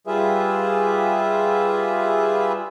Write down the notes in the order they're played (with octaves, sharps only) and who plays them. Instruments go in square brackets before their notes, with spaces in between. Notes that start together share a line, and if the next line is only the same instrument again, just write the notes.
[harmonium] G3 F4 G#4 B4 E5